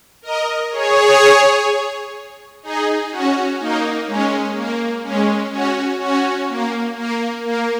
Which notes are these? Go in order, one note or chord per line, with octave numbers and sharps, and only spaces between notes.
A#4 D#5
G#4 C#5
D#4 G#4
C#4 F#4
A#3 D#4
G#3 C#4
A#3
G#3 C#4
C#4 F#4
C#4 F#4
A#3
A#3
A#3